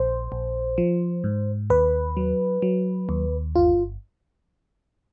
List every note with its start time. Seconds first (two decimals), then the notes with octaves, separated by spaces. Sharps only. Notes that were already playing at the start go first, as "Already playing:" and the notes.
Already playing: A#1 C5
0.32 A#1
0.78 F3
1.24 G#2
1.70 D#2 B4
2.17 F#3
2.62 F#3
3.09 D#2
3.56 G1 F4